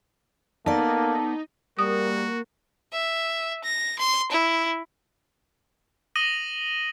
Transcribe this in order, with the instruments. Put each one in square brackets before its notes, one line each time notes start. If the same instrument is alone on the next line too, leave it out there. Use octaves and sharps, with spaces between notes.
[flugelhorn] A#3 [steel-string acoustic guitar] B3 D5 [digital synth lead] D#4 [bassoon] A4
[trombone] G3 [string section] A#3 [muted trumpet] F#4 [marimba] D#6
[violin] E5
A#6
C6
E4
[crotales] D6 D#6 A#6 D#7 F#7 G7